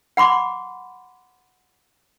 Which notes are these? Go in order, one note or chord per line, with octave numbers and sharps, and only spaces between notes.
F#5 B5 C6 D6